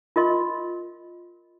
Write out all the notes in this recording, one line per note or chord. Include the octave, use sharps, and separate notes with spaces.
F4 A#4 D#5 C6